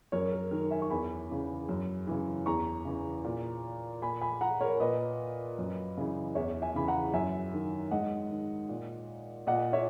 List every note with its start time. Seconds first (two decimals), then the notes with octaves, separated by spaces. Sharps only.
0.12 F#2 A#4 C#5
0.32 A#4
0.51 D#3 A#4
0.71 E5 G#5
0.82 C#6
0.90 E2 G#5 B5
1.30 C#3 E3
1.69 F#2
2.07 C#3 E3
2.46 E2 A#5 C#6
2.85 C#3 E3
3.24 A#2
4.02 A#2 G#5 B5
4.21 G#5 B5
4.41 F#5 A#5
4.61 A#4 C#5
4.80 A#2 B4 D#5
5.58 F#2
5.97 C#3 E3
6.35 E2 C#5 E5
6.62 E5 G#5
6.75 C#3 E3 B5
6.88 F#5 A#5
7.13 F#2 E5 G#5
7.53 D#3
7.91 G#2 D#5 F#5
8.31 D#3
8.69 A#2
9.47 A#2 D#5 F#5
9.73 C#5 E5